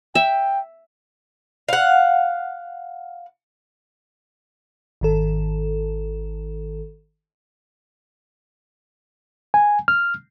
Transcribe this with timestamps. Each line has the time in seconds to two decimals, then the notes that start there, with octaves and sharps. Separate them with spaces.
0.15 E5 G5
1.68 F5 F#5
5.01 G#1 D#3 A4
9.54 G#5
9.88 F6